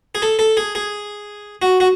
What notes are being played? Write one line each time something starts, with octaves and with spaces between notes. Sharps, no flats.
G#4
A4
A4
G#4
G#4
F#4
F#4